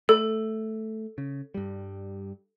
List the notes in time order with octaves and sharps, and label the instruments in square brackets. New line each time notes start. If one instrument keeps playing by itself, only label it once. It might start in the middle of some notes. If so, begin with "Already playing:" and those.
[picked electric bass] A3 [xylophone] A4
[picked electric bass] C#3
G2 G3